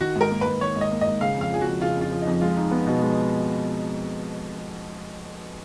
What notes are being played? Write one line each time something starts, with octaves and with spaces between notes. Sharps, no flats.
D#3 F#4
G#2 A#4
A#3
G#2 B4
D#3 C#5
G#2
D#5
A#3
G#2 D#5
C#3 F5
F2 F5
F3 G#4
F2 F#4
C#3 F4
F2 F4
F3
D#4
F2
G#3 F4
D#4
B3
B2
G#3